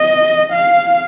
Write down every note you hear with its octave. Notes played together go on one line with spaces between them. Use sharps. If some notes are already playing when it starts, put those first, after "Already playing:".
Already playing: D#5
F5